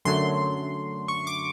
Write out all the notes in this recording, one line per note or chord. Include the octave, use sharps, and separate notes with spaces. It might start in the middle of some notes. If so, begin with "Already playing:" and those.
F#2 D3 F#3 A3 C6
C#6
D6